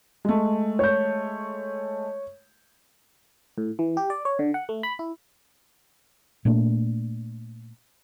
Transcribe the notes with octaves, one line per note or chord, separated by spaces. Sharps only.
G#3 A3
C#5 G6
A2
E3
G4
D5
C#5
D3
F#5
A3
B5
E4
A#2 A3 A#3 D4